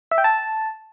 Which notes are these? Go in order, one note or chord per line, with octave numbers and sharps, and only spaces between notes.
E5
G5
A5